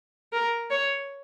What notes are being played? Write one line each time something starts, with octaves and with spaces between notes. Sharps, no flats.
A#4
C#5